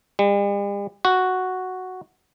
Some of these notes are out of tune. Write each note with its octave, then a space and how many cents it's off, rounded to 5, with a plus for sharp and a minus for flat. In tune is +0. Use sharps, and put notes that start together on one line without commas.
G3 +45
F#4 +0